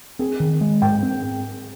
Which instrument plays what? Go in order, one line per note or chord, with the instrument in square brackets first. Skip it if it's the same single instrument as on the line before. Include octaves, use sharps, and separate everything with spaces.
[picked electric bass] C4 [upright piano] G#4
[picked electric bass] D#3
G#3
[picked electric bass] G#2 [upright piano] G5
[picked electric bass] C4